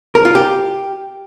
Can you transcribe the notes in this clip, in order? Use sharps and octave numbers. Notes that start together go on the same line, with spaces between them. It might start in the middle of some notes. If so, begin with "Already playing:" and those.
A#4
F4
G4